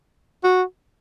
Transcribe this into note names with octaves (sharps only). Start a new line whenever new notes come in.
F#4